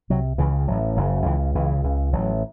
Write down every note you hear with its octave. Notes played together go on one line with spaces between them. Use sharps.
C2 C3 F#3
C#2 C#3 E3
A1 A2 F#3
F#1 F#2 C#3 F#3
C#2 C#3 E3
C#2 C#3 E3
C#2 C#3
A1 A2 F#3